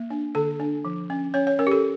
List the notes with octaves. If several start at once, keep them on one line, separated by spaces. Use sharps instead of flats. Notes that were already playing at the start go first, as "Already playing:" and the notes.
Already playing: A#3
D4
D3 A4
D4
F3
C#4
C#4 C#5
C#5
C#4 A#4
G4
A4